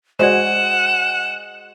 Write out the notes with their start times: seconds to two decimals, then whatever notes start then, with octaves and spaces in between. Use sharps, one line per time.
0.19 G#3 F#4 C5 D5 F#5 E7